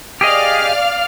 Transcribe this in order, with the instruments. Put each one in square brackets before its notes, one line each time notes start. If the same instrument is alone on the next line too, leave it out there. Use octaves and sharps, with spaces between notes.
[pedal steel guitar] G4 G#4 D#5 [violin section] D5 F5 F6